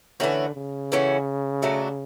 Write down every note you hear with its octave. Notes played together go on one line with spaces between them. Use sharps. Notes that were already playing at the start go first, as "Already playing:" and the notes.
D3 E3 A3 C#4 F#4
C#3
E3 A3 C#4 F#4
F#3 A3 D4 F#4